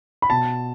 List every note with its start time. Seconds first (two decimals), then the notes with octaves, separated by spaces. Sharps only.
0.22 B5
0.30 B2 A5